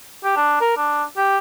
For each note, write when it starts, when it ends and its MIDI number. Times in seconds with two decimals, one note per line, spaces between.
0.24 0.35 67
0.37 0.58 62
0.61 0.73 70
0.77 1.04 62
1.17 1.38 67